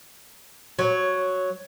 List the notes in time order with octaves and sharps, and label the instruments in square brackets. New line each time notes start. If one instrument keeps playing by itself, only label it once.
[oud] F#3